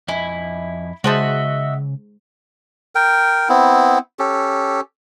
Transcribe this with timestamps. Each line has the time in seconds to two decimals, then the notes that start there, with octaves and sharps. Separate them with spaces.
0.08 F2 E4 D#5 G#5
1.04 C#3 G#3 F#4 C5 D#5 E5 A5
2.95 A#4 G5
3.49 B3 C4 E4
4.19 C#4 G4 A4